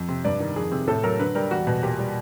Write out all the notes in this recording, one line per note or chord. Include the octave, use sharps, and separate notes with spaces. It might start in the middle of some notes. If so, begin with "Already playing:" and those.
Already playing: F2
C3
G2 D5
D#3
F2 G#4
C3
A2 A4
F#3 A#4
D3 B4
G3 A#4
E2 F#4
B2
A#2 G4
G3